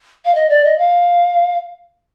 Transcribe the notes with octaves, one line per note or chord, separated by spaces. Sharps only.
F5
D#5
D5
D#5
F5